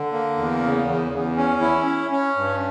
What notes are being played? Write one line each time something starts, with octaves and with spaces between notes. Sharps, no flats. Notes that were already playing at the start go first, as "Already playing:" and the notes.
Already playing: D3
A#3
E2
C#3
E2
E2
C#4
E4
C#4
C#4
G2